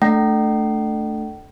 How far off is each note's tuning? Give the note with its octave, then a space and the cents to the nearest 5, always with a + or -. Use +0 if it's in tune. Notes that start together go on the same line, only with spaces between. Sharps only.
A3 +0 D4 +0 G5 -45